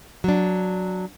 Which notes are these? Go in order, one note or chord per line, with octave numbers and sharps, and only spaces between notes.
F#3 D4